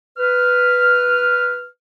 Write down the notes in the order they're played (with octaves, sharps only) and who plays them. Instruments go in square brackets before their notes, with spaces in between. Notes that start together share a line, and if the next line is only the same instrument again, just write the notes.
[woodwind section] B4 F6